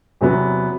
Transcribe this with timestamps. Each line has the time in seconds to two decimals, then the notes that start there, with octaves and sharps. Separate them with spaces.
0.21 E2 C3 F#3 B3